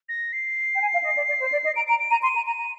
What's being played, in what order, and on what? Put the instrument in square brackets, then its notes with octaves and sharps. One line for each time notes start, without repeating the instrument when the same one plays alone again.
[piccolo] A#6
C7
[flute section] G5
G#5
F5
D#5
D5
D5
C5
D5
D#5
[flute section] A#5 [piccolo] D7
[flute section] A#5 [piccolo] D7
[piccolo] D7
[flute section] A#5 [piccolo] D#7
[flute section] C6 [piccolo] D#7
[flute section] A#5
[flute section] A#5 [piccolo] D#7
[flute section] A#5